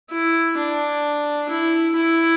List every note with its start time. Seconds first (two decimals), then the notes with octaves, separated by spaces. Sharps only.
0.10 E4
0.57 D4
1.49 E4
1.95 E4